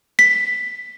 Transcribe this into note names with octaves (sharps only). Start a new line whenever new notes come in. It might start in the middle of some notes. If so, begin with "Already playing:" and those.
B6